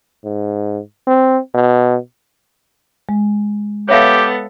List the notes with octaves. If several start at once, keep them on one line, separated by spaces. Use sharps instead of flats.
G#2
C4
B2
G#3
B3 G4 A4 C#5 E5 F5